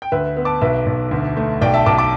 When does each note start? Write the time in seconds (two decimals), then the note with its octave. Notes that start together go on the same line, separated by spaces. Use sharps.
0.02 G5
0.12 D2 B4 E5
0.36 B3
0.45 A5 D6
0.61 B1 B4 E5
0.86 B1
1.11 D2
1.37 A3
1.61 B1 D5 G5
1.74 E5 A5
1.86 B1 A5 D6
1.98 A5 D6